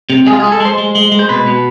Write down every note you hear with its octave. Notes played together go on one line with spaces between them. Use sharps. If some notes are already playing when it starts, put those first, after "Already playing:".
C3
G#3 G#4
F4
G#3 G#4
A4
G#3 C5
G#3
G#3
G#3
C5
B2 B4
B2